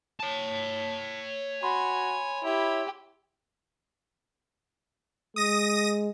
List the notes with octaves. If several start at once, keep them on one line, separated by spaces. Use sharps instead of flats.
C#5 A5
F#4 G#5 B5 C6
E4 G4
G#3 D#6 A#6 D#7